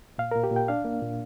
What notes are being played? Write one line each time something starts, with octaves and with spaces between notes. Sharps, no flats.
A#2 F5
A#2 A#4
G4
A#2 G5
D4 F5
A#3
A#2